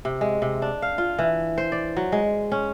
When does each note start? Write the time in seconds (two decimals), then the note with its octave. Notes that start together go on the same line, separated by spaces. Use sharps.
0.05 C3
0.21 G#3
0.42 C3
0.62 D4
0.82 F5
0.98 F4
1.19 E3
1.58 C5
1.72 D5
1.97 F#3
2.12 G#3
2.52 C#4